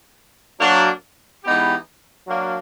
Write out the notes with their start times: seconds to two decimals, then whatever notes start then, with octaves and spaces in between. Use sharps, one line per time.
0.60 F#3 A#3 D4
1.45 E3 G#3 B3 D#4 G4
2.28 F#3 A#3 D4